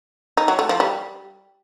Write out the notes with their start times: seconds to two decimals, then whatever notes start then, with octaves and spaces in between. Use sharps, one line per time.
0.37 D#4
0.48 F#3
0.59 A3
0.69 F3
0.80 G3